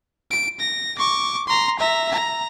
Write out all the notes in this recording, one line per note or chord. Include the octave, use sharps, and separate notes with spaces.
D7
A#6
C#6 D6
A#5 C6
E5 A#5
A#5